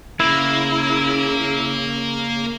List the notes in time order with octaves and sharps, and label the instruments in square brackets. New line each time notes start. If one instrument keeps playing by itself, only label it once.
[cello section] C#3 [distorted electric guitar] A#3 [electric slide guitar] E4